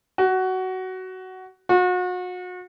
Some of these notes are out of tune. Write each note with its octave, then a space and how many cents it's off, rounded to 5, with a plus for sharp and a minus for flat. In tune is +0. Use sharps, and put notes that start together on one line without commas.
F#4 +15
F#4 -35